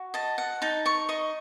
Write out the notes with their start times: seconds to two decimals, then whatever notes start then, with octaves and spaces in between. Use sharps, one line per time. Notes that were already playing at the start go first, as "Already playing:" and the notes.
Already playing: F#4
0.14 D#5 A5
0.38 F#5
0.62 D#4 A5
0.86 C#6
1.09 D#5 C#6